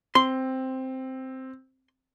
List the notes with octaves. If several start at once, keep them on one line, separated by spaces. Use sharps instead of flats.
C4 C6